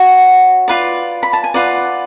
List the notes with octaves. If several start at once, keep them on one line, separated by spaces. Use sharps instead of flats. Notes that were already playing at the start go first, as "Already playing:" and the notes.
Already playing: F#4 C#5 F#5
F4 B4 D5
B5
A5
G#5
F4 B4 D5 F#5